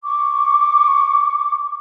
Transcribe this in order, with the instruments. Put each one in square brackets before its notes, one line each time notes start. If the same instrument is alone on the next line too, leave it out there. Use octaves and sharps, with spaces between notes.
[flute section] C#6 D6